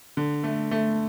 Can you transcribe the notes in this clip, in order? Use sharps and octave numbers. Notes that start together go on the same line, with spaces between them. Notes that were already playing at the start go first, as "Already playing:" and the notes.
D3
A3
A3